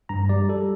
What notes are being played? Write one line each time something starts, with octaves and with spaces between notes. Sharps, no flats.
G2 A#5
G3 D5
G3 A4